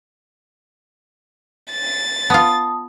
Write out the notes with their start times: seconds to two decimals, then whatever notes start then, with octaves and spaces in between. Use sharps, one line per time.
1.71 A6
2.30 B3 F4 A5 D#6